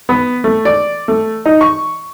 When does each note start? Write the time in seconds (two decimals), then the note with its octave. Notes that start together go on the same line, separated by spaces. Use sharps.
0.09 B3
0.44 A3
0.65 D5
1.08 A3
1.46 D#4
1.61 C#6